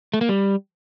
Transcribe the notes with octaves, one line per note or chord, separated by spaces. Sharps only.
A3
A#3
G3